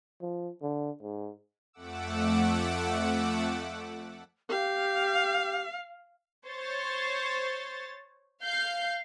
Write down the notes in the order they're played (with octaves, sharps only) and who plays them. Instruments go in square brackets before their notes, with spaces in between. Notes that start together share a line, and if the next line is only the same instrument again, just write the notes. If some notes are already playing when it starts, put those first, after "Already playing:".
[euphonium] F3
D3
G#2
[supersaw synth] F2 A3 F#5 D6 E6
[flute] G4 [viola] F5
[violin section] C5 C#5 A6
F5 G6 C7